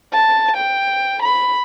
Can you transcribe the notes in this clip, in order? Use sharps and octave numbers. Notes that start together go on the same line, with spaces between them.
A5
G5
B5